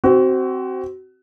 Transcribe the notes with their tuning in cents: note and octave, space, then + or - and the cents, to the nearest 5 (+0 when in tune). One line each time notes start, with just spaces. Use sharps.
C4 +0 F#4 +25